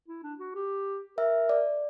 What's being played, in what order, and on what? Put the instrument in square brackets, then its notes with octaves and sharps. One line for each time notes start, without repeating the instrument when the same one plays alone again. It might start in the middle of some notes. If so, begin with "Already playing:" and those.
[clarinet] E4
D4
F#4
G4
[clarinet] A#4 [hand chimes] E5
[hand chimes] D5